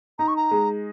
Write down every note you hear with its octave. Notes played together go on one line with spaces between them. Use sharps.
D#4 A#5
C#6
A#5
G#3